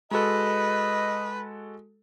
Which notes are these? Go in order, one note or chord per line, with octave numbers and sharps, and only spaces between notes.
G#3 F#4 A4 B4 D#5